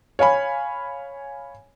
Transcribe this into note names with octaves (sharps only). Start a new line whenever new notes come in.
C#5 F5 G#5 B5